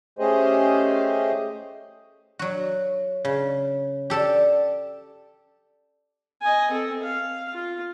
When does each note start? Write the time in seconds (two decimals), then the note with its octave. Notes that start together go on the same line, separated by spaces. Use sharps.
0.19 A3 C#4 G4 G#4 C5 D#5
2.39 F#3 F#4
3.25 C#3
4.10 G4 A4 D5 A5
6.42 D#5 G#5
6.71 C4 A4
7.03 F5
7.53 F4